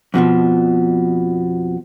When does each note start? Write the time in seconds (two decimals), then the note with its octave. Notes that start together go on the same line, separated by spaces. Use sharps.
0.14 F2 B2 D#3 F3